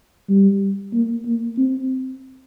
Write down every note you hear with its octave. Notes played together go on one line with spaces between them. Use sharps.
G3
A#3
A#3
C4